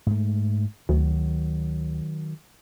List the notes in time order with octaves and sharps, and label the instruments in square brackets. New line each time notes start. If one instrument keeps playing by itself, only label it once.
[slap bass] G#2 A3
[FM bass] D2 [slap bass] D#3 F#3